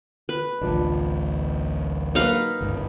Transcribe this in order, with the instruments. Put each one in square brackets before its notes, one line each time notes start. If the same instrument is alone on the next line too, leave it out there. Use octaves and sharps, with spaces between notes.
[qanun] B4
[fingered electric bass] A1 D2 [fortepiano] F3 D4
[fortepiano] F#3 A#3 [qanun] D#4 B4 F5
[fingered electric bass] G1 C#2 G#2